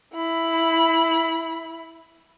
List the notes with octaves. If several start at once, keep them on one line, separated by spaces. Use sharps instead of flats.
E4 B5